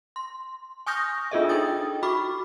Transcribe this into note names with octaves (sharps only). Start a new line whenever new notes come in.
C6
G#5 C#6 D#6 F6 G6 A#6
D4 F4 G#4 A4 D#5 E5
D#4 F4 G5 D#6 A6
F#4 B5 C#6 D6